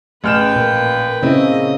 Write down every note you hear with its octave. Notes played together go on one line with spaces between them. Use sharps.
A1 C#3 B4 G5 F6 E7
A#2 A#3
C#3 A#3 C4 C#4 E4 D#5